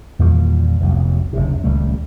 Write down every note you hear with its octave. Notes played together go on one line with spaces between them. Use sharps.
E2 A#2 D#3 G3
F1 B1
F#1 D2 C3
D#1 C#2 G3 A3